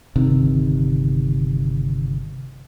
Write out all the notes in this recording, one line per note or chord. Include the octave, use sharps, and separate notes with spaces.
G1 C3 D#3